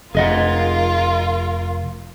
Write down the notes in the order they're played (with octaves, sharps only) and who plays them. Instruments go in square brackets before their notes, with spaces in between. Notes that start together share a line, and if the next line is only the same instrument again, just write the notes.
[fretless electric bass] F1 [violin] F4 A#4 [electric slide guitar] G#4 D#5 F#5